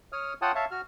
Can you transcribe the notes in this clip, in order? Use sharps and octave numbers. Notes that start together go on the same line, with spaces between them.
C#5 D#6 F6
F4 C#5 F#5 G5 A5 D#6
C#5 E5 F5 A5
F#4 F6